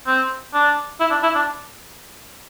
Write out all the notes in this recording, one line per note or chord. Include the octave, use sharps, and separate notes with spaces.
C4
D4
E4
D4
E4
D4